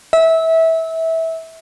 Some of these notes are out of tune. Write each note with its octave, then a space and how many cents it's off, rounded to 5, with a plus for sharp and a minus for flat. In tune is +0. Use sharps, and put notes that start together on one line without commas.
E5 -20